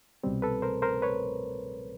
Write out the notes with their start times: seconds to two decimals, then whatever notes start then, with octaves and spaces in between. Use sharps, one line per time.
0.24 C2 B2 G3 C4
0.42 A4 B4
0.62 A#4 C5
0.82 A#4 C5
1.02 B4 C#5